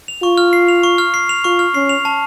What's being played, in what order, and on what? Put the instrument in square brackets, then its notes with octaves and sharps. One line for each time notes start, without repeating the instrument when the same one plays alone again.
[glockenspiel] F7
[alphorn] F4 [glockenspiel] C#6
[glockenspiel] F6
C7
F7
C#6
F6
C7
F7
[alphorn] F4 [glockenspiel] C#6
[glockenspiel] F6
[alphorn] C#4 [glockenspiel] C7
[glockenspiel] F7
A5